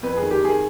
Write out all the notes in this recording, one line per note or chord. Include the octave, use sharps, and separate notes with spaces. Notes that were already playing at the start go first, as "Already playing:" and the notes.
F2 B4
D#3 G#4
G4
D#3 G#4